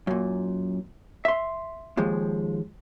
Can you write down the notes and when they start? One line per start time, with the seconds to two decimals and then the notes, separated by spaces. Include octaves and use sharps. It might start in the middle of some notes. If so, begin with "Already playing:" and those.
0.07 F#2 A#2
1.25 E5 C6
1.97 D#2 F3 G#3